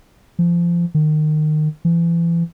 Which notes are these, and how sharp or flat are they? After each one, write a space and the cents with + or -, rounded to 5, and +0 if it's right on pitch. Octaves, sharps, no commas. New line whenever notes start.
F3 -25
D#3 -25
E3 +35